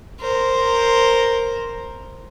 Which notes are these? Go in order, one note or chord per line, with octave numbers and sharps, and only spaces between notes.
A#4 C5